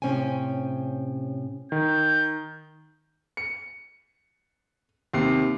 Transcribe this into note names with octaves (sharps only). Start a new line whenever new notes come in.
A2 C3 C#4 C5 G5 G#5
D#3 G6
C#7
D#2 C3 C7